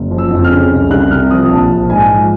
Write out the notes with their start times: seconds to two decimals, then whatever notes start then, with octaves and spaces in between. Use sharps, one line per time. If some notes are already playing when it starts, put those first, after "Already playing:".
Already playing: F#1
0.11 F3
0.18 E6
0.31 F2
0.44 F6
0.51 C#3
0.72 C2
0.91 C2 F#6
1.11 C3 F6
1.31 F3 D#6
1.50 A#1 A5
1.70 A#1
1.90 G#2 G#5
2.10 F3